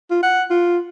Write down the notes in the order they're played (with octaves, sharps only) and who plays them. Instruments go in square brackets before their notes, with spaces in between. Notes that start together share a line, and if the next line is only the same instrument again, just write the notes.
[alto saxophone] F4
F#5
F4